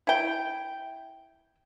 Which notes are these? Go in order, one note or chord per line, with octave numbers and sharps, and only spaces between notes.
E4 G5